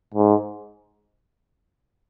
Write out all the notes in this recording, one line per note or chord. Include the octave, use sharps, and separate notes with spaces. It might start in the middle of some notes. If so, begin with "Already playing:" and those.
G#2